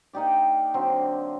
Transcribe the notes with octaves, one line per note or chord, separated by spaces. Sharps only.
A#3 D#4 G4 D5
D3 F#3 C4